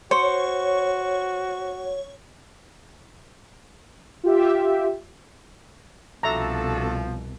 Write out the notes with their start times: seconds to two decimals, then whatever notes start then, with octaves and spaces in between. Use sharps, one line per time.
0.11 F#4 C5 C#5
4.24 F4 G4 E5
6.23 C2 B2 F3 D4 F#4 A4 E5 A#5